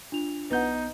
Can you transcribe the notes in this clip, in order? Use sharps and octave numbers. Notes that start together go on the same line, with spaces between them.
D4 F4 F7
B1 B3 D#4 B4 F#5 G6